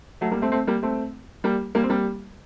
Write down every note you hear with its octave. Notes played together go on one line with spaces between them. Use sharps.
F#3 A3
G3 A#3
A3 C4
A3 C4
G3 A#3
A3 C4
G3 A#3
G3 A#3
C4
G3 A#3